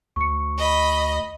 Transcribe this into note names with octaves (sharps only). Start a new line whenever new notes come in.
D2 C#6 C#7
D#5 B5